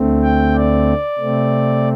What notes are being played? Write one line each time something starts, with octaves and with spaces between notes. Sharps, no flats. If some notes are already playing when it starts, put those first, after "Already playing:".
Already playing: D2 D3 A3 C4
G5
D5
C3 A3 C4